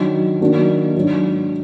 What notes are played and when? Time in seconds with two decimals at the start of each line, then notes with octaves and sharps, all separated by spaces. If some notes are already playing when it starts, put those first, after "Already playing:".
Already playing: D#3 F#3 D4 F#4
0.41 D#3 F#3 A#3 D4 F#4
0.95 G#2 F#3 D4